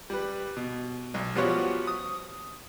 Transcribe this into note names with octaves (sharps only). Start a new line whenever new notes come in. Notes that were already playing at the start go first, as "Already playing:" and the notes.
G3 B4
B2
B1
F3 G3 B3 F4 F#4 C#5
D#6